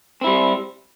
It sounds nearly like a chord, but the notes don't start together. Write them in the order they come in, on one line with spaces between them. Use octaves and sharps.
C4 E4 G3